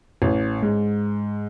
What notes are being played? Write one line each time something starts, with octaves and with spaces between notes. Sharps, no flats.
A1
G#2